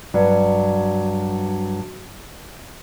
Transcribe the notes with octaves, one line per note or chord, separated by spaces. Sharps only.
G2 F#3